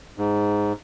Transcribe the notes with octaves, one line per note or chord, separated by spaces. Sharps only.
G#2